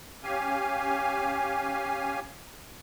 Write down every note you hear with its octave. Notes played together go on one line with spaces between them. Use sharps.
C#4 G4 F5 G#5